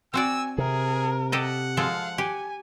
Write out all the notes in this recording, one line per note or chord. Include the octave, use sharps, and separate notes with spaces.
C4 F#4 D5 G#5 E6
C3 G#4 A#4
G4 A4 D#5 F#5
F3 G#3 A4 F5
G4 G#5